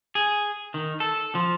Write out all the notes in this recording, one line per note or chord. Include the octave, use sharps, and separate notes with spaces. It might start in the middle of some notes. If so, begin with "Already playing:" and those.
G#4
D#3
A4
F3